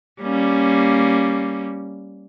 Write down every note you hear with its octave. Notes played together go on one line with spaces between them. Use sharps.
G3 A#3 C#4